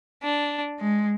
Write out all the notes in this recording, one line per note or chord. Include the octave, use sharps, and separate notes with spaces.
D4
G#3